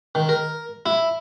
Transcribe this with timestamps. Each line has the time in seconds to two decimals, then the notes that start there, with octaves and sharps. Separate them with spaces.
0.15 D#3
0.29 A#4
0.86 E4